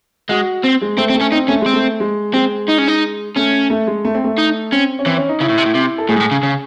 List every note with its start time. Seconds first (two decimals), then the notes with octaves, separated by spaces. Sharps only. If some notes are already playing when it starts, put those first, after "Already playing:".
0.29 G#3 F#4
0.64 C4
0.81 G#3
0.97 A3 C4
1.10 C4
1.14 A3
1.21 C#4
1.32 C4 D#4
1.48 A3 C#4
1.61 G#3 C4
1.73 A3
2.00 G#3
2.33 G#3 C4
2.68 D#4
2.78 C#4
2.88 D#4
3.36 A3 C#4
3.70 A3
3.87 G#3
4.05 A3
4.14 C4
4.24 A3
4.38 D#4
4.72 C4 C#4
4.99 C#4
5.06 E3 C4
5.18 C#4
5.29 D#4
5.40 C#3 E4
5.49 A2
5.58 C3
5.65 A2
5.75 C3
5.98 A4
6.09 A2 G#4
6.16 G#2
6.20 A2
6.31 C#3
6.43 C#3